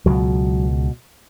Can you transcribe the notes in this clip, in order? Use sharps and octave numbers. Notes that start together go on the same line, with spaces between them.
C#2 B2 F#3